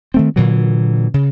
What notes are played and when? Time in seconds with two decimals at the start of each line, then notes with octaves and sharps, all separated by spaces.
0.14 D#3 A3 C4
0.36 A#2 D3 E3 F#3
1.14 C#3